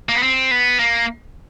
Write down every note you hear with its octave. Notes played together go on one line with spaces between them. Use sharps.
A#3
B3
C4
B3
A#3